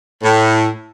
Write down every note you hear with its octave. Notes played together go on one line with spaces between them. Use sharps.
A2